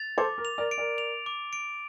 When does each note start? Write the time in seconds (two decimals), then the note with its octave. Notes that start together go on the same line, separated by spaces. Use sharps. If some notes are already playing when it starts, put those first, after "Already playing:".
Already playing: A6 F7
0.18 A4 C5 D6
0.38 A#4
0.45 F7
0.58 A#4 D5
0.71 D7
0.78 A#4 D5
0.98 F7
1.26 D6
1.53 D7